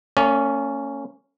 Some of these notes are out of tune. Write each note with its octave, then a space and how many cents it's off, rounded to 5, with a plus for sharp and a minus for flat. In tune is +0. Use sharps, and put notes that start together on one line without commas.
A#3 -45 C#4 +0 D5 -25